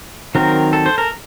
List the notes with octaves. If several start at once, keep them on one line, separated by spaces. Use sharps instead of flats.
D#3 F#3 C4 A#4
A4
C5
A#4